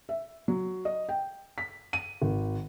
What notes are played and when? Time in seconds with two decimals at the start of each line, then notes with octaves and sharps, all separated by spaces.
0.09 E5
0.48 F#3
0.85 D#5
1.09 G5
1.58 B6
1.93 D#7
2.22 G#1